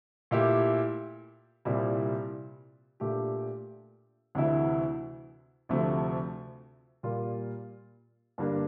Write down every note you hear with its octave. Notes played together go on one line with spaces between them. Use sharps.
A#2 A3 E4 G4
C2 A#2 G3 C4 E4
A#2 A3 D4 G4
D2 C3 E3 A3 E4
D2 C3 F3 A3
A#2 G3 A#3 F4
G2 D3 G3 A#3 D4